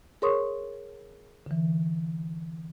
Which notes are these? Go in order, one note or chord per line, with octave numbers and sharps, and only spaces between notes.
G#4 A#4 C#5 C6 C#6 D#6
D3 E3